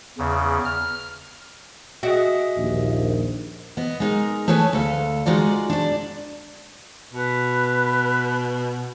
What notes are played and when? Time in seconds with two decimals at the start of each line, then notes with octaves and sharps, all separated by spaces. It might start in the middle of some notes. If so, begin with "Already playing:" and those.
0.18 E2 C#3
0.65 F6
2.03 F#4 G#4 D#5 E5
2.58 A#1 D#2
3.77 B3 D#5
4.00 G#3 D#4 A#4
4.48 A3 G#4 B4 C#5 G#5 A5
4.73 D2 A4 F5
5.26 G#3 D#4 F4 F#4 D5
5.70 D4 D5
7.13 B2 B4